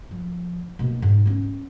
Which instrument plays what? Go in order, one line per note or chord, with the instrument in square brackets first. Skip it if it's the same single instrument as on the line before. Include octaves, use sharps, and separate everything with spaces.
[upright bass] F3
B2 A#3
G#2
B3 C#4